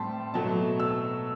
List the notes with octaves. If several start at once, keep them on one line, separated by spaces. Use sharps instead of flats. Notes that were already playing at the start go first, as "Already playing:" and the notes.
Already playing: A2 G3 C4 A5 C6
B2 F#3 A3 A5
E6